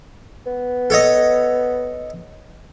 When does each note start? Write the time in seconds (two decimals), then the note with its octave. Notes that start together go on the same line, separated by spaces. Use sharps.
0.46 B3
0.90 A4 C#5 D#5